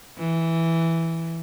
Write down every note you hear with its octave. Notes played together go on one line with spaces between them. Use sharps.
E3